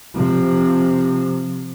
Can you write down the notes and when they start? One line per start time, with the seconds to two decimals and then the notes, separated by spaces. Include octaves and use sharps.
0.15 C3 F3